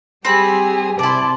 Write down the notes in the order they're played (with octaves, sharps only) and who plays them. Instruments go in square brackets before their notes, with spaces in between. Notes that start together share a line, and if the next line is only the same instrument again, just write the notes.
[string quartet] G3 G4 G#4 [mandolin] C4 B5
[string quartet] C3 A5 C6 [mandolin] E4 D5